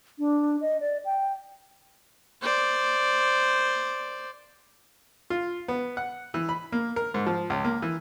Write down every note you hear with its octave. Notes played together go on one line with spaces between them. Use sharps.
D4
D#5
D5
G5
C5 D5
F4
B3
F#5
E3
B5
A#3
A#4
G#2
F3
C#2
A#3
E3